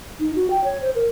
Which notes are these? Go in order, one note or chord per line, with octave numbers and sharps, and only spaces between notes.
D#4
F#4
G5
C#5
C5
A#4